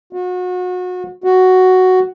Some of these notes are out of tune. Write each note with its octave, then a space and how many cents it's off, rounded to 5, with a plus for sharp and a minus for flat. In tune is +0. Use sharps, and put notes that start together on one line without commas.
F#4 -30
F#4 +5